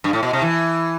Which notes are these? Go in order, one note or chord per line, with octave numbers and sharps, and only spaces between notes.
G2
A2
B2
C3
E3